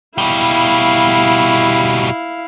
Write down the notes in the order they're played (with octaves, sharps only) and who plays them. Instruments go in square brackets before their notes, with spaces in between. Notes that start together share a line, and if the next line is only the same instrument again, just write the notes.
[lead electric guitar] B2 G3 [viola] E4 F5